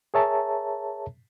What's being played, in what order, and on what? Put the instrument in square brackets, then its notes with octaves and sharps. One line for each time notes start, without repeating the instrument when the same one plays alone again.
[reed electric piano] G#4 A#4 C#5 E5 A5 A#5